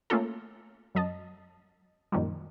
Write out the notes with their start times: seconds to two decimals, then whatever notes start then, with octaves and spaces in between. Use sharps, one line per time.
0.10 A3 A#3 C#4 F4 A4
0.95 F#2 F#3 D#5 A5
2.12 F#2 A#2 D#3 F3 G3